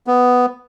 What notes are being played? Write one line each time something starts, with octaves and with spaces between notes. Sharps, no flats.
B3